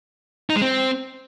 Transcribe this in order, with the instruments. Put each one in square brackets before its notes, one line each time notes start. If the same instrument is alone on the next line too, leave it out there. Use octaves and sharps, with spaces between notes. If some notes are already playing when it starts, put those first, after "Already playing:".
[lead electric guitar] D#4
G#3
C4